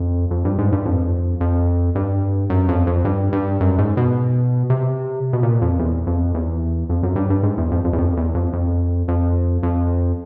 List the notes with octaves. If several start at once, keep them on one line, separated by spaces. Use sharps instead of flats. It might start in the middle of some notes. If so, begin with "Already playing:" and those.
Already playing: F2
F2
G2
G#2
G2
F2
F2
G2
F#2
F2
F2
G2
G2
F#2
G#2
B2
C3
B2
A#2
F2
E2
F2
E2
F2
F#2
G2
G2
G#2
E2
F2
F2
E2
F2
E2
F2
F2
F2
F2